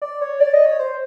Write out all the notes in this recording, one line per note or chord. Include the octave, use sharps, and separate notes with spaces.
D5
C#5
D5
D#5
C#5
C5